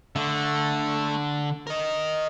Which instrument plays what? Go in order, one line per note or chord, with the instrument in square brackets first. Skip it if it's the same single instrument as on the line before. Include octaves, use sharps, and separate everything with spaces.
[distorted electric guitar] D3 [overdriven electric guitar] A3 E5
[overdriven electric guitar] A#4 D#5